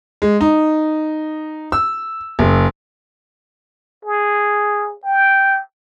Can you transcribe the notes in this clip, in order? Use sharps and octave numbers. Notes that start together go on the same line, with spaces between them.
G#3
D#4
E6
F#1
G#4
G5